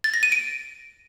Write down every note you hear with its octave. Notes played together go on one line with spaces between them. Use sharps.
A6
A#6
D#7
D7